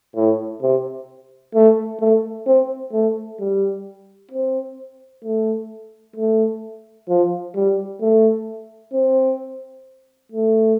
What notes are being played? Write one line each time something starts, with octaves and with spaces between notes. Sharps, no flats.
A2
C3
A3
A3
C4
A3
G3
C4
A3
A3
F3
G3
A3
C4
A3